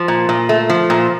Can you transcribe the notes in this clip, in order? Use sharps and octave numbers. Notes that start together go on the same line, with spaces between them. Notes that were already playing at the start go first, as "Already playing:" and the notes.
Already playing: F3
A#2
A#2
A3
F3
A#2